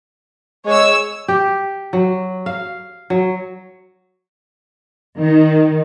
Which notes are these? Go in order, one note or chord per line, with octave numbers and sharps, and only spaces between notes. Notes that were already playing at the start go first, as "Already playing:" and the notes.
G#3 C#5 E6
G4
F#3
F5
F#3
D#3